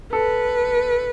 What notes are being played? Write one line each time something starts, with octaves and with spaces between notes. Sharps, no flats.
A4 B4